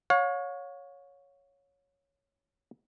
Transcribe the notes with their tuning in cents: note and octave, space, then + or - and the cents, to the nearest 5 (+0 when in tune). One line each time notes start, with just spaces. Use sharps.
C#5 +0 F5 +40